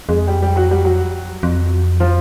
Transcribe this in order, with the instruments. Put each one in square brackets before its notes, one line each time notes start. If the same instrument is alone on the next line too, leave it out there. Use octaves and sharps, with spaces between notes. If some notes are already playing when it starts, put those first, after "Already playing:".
[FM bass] F2 [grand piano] G#3 G#4
[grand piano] G#4
G3 G4
G3 G4
F#3 F#4
G3 G4
F#3 F#4
[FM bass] F2
[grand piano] F3 F4